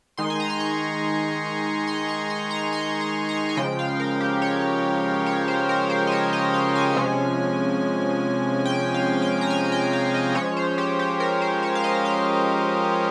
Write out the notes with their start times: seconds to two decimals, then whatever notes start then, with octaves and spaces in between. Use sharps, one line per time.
0.17 D#3 G#3 D#4 C6
0.30 G#5
0.40 A#5
0.50 C6
0.60 C#6
1.87 C6
2.08 C#6
2.30 C6
2.51 A#5
2.73 C6
3.01 A#5
3.29 A#5
3.49 G#5
3.57 C#3 F3 G#3 G5
3.79 F5
4.00 A#4
4.21 G4
4.42 C#5
5.26 C#5
5.48 C5
5.69 A#4
5.90 C5
6.07 D#5
6.12 C#5
6.33 D#5
6.54 F5
6.75 G#5
6.96 C3 F3 G#3 C#4
8.65 G5
8.94 F5
9.22 G5
9.41 A#5
9.50 G#5
9.72 G5
9.93 F5
10.14 D#5
10.35 F3 G#3 C#4 C#5
10.57 C5
10.78 G4
10.99 G4
11.20 A#4
11.41 C5
11.63 C#5
11.75 F5
11.84 D#5
12.05 F5